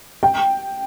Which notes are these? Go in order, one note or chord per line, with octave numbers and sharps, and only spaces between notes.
G5